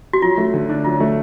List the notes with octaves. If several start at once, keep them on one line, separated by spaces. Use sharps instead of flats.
F#4
F#3 F4
A3
D3
D4
F#3 F4
A3